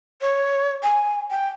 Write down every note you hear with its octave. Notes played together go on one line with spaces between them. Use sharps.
C#5
G#5
G5